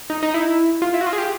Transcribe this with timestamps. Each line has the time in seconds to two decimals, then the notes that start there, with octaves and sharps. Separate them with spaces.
0.10 D#4
0.23 D#4
0.34 E4
0.82 F4
0.94 E4
1.01 F#4
1.06 F4
1.13 G#4
1.18 G4